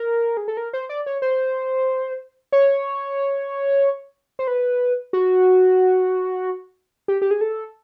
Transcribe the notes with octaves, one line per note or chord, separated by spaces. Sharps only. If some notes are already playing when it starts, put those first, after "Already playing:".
Already playing: A#4
G#4
A4
A#4
C5
D5
C#5
C5
C#5
C5
B4
F#4
G4
G4
G#4
A4